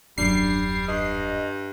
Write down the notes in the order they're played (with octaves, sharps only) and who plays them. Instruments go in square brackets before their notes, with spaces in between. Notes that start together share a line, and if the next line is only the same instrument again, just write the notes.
[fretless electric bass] D#1 F#2 [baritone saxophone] G3 [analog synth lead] D4 [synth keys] C7
[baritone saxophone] G2 [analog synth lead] D#5